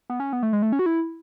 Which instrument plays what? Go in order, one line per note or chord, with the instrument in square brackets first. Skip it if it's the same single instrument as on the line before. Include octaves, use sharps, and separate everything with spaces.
[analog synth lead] B3
C#4
B3
A3
G#3
A3
C#4
F#4
E4